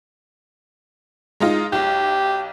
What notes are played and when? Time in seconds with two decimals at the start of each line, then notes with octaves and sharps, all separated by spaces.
1.40 G#3 D#4 F4
1.72 B1 G4